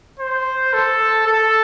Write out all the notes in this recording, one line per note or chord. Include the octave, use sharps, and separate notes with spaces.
C5
A4
A4